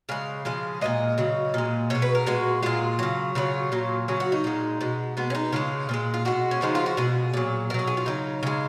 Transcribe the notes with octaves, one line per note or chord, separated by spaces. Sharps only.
C#3 G#3 F5
C#3 F3 G#3
A#2 F3 G#3 D#5
C#3 F#3
A#2 G#3
B2 G#3 C#5
B4
A#4
A#2 G#3 F#4
A#2 G#3 F4
C#3 F#3
C#3 F#3 F4
A#2 F#3
C#3 F#3 G#4
F#4
D#4
A#2 G#3
B2 G#3
B2 G#3 B3
C#4
D#4
C#3 F3 G#3 F4
A#2 F3 G#3
F4
B2 G#3 F#4
C#4
C#3 F3 G#3 D#4
F4
F#4
B2 G#3 G#4
A#2 F#3
B2 F#3 G#4 A#4
G#4
F4
C#3 F#3 D#4
C#3 G#3